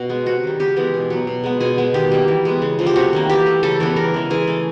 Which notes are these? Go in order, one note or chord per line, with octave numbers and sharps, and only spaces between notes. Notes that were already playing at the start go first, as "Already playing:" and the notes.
Already playing: B2 F#4
G#3 B3
C3 F#4
D#3 G3
C#3 G4
E3 G#3 B3
B2
F#3 B3
B2
G#3 B3
B2 G#4
G#3 B3
D#3 G4
G3 A#3
E3
G#3 B3
C#3
F3 A3
G4
C3 F#4
D#3 G3 A#3
E3 G4
A3
C#3 A4
E3 G3 B3
C#3 A#4
E3 G#3
E3 G#4
A3